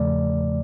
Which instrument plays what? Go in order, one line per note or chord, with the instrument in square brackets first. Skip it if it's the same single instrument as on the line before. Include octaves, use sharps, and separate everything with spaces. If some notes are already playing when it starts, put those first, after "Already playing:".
Already playing: [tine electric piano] E2 C#3 F3 A3 D5